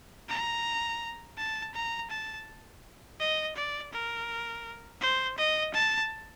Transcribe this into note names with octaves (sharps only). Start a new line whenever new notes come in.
A#5
A5
A#5
A5
D#5
D5
A#4
C5
D#5
A5